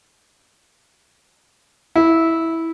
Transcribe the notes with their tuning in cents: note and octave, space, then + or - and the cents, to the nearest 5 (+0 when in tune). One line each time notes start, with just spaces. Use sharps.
E4 -10